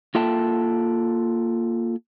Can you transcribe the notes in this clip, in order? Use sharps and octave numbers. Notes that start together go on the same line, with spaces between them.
A#3 F4 A4 E5 G5 A5